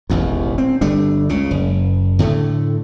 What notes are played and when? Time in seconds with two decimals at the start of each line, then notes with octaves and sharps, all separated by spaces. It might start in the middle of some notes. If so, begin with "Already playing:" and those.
0.10 E1 A1 D#2
0.58 C4
0.81 G1 G3 A3 D4
1.29 C#2 C#3
1.51 F#1
2.19 A2 D3 A3